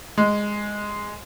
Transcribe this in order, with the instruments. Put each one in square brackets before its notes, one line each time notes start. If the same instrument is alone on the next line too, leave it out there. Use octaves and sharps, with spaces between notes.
[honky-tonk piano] G#3